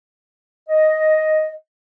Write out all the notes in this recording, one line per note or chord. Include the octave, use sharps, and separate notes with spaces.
D#5